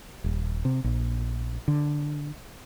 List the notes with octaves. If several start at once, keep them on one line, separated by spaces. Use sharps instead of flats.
D#1
C3
A#1
D3